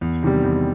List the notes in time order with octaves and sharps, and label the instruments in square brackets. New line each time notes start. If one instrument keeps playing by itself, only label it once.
[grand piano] E2
C3 D#3 G3
E2